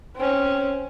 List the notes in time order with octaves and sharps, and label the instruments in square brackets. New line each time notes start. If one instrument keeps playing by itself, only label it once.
[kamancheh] C4 C#4